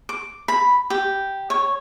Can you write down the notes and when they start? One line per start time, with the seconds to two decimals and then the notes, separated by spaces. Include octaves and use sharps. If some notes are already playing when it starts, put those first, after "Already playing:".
0.09 D6
0.48 B5
0.90 G4
1.50 C#5